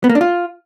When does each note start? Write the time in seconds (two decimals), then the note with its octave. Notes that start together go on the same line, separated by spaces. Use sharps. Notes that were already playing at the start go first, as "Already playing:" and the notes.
0.04 B3
0.10 A#3
0.15 D4
0.21 F4